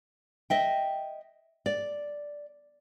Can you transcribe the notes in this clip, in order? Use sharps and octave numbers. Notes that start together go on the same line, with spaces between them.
D#5 E5 G5
D5